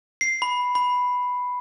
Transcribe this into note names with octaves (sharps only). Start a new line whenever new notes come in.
C7
B5
B5